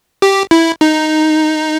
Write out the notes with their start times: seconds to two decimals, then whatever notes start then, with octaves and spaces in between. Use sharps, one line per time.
0.22 G4
0.51 E4
0.81 D#4